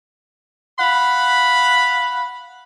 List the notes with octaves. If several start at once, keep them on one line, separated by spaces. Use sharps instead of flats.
F5 F#5 B5